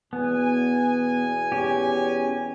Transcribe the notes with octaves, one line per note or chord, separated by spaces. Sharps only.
E2 B2 B3 G#5
C#4 G4